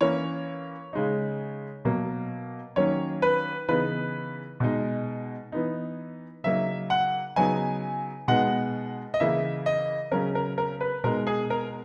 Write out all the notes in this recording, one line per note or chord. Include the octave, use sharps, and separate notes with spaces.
E3 A#3 C#4 C#5
C#3 G#3 D#4
B2 F#3 A#3
D#3 F#3 A#3 C#4 C#5
B4
C#3 E3 B3 D#4 B4
B2 G#3 D#4
E3 B3 D#4
C#3 F#3 A#3 D#4 E5
F#5
C#3 F#3 B3 D#4 G#5
B2 G#3 B3 D#4 F#5
D#5
C#3 E3 A#3 E5
D#5
C#3 F#3 C#4 A#4
A#4
A#4
B4
B2 G#3 D#4 A#4
G#4
A#4